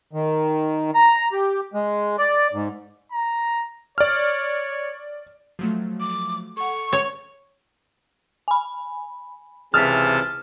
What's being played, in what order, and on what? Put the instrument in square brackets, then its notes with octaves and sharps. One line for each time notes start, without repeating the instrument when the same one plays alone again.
[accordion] D#3
A#5
G4
G#3
D5
G#2
[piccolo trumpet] A#5
[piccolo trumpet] C#5 [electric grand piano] D5 F6
[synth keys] F3 F#3 A3
[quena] D6
[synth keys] A4 F#5 [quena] C#6
[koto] C#5
[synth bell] G#5 B5
[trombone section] C#2 E3 G#4 [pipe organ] C3 A5 [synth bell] D#6 [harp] F6 B6